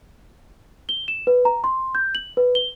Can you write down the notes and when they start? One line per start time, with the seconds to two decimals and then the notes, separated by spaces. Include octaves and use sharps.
0.89 G7
1.08 E7
1.27 B4
1.45 A#5
1.64 C6
1.95 G6
2.15 F#7
2.37 B4
2.55 G7